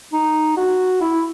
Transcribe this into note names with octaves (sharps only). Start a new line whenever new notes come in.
D#4
F#4
E4